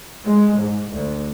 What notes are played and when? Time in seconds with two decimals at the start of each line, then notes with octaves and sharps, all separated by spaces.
0.24 G#3
0.58 G#2
0.91 D2